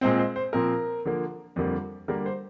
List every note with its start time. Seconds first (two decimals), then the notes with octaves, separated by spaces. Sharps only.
0.01 A#2 G#3 C4 C5
0.19 C5
0.36 C5
0.53 A#2 F3 C4 A#4
1.06 D3 F3 A#3
1.56 F2 D3 G3 A#3
2.08 D3 G3 A#3 A#4
2.26 C5